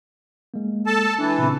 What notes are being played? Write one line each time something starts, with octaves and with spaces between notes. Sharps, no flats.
G#3 A#3
A4 A5
E3 D4
A#2 C#3 C4